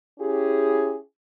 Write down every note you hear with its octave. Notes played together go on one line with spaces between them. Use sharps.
C#4 E4 G4 G#4